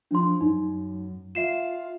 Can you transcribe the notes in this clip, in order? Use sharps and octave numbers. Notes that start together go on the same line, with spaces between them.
F3 D4 C6
F#2 D#4
F4 E5 C7 E7